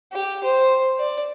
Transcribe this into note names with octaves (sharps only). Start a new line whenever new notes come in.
G4
C5
D5